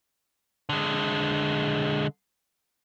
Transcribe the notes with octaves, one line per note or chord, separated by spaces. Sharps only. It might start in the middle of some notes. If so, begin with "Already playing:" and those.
D3 G#3